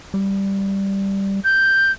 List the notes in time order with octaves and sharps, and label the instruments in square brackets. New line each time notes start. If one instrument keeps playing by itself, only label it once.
[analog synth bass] G3
[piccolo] G6